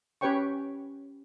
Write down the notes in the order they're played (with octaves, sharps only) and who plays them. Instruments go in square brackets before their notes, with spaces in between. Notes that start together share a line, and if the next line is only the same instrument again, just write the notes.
[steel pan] C#4 G4 B4 C#5 G5 C#6